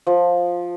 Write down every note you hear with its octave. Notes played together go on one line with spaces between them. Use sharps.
F3